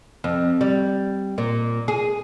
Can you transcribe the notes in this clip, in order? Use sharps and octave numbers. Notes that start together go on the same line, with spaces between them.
F2
G3
A#2
G#4